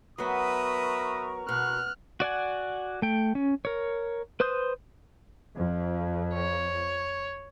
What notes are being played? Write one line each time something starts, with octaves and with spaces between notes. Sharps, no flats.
F#3 B3 A#4 B4 E5 A#5 C#6 D#6
B2 F6 F#6
F#4 D5 F#5 G#5
A3 G5
C#4
A#4 C#5
B4 C5 C6 D#6 G6
F2
C#5